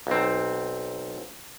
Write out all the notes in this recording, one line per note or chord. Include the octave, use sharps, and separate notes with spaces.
B1 C4